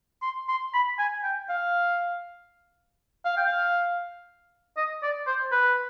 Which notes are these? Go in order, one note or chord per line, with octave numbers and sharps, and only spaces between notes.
C6
C6
B5
G#5
G5
F5
F5
G5
F5
D#5
D5
C5
B4